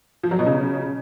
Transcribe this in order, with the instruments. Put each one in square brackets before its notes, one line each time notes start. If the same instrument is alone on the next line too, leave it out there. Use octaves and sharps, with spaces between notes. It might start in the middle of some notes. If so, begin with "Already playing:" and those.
[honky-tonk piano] F3
F#3
B2
C#3